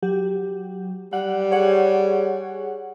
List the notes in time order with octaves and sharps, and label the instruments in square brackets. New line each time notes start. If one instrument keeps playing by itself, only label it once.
[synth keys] F#3 G4
[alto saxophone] G3 [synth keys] F#5
[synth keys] G#4 C#5 F#5